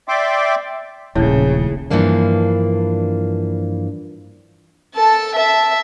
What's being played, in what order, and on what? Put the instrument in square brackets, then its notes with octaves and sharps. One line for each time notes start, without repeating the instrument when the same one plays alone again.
[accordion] D5 E5 G5 C6 D6
[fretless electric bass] D#1 A#1 [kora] A2 [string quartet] C#3
[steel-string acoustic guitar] G2 E3 F3 A#3 D4
[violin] A4 A5
E5 A5